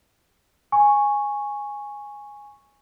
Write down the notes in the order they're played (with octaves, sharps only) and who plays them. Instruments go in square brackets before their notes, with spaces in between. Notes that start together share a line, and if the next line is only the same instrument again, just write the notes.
[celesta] G#5 C#6